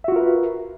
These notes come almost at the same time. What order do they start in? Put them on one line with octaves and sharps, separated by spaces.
E5 F#4 F4 A#4 B4